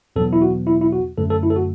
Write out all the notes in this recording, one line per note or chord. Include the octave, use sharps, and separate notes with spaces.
E2 B2 F#3 B3 A4
E4
F#4
E4
E4
F#4
F#2 D3 A3 A4
A4
E4
A4
F#4